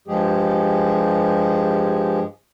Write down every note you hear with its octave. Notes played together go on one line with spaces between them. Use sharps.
G2 F3 G#3 G4 G#4